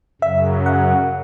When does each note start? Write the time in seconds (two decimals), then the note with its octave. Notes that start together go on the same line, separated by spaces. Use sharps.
0.21 F#2 C#3 F#3 E5
0.66 F#5